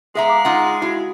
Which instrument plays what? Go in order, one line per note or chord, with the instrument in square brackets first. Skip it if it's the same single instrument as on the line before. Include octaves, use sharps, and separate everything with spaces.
[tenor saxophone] G#3 [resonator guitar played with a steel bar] B3 E5 A#5 [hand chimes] G#4
[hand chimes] F5 D6
[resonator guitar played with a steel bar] D#4 F4 F#5
[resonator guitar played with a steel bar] E4 [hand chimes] F#4